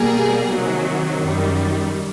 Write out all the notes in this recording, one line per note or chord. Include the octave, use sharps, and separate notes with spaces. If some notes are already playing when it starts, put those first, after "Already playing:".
Already playing: B2 G3 A#3 G#4 A#4
C3 D#3 F#3
F#2 D#3 G3